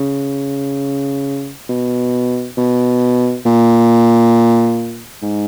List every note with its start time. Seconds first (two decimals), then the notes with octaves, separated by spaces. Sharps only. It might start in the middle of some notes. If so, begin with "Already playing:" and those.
Already playing: C#3
1.69 B2
2.58 B2
3.46 A#2
5.22 G#2